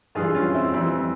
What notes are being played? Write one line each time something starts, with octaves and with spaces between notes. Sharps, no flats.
G2 E3 G3 F4 G#4
C#4 F4
C4 E4
F2 E3 G3 C4